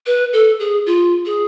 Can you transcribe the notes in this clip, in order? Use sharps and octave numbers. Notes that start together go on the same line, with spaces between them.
B4
A4
G#4
F4
G#4